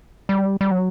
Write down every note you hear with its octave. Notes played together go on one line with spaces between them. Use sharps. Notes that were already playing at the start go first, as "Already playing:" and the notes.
G3
G3
F#3